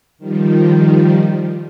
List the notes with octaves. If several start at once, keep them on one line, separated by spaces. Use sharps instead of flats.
D#3 F3 G3